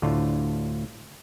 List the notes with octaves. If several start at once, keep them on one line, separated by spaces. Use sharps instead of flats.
D2 A2 D3 F4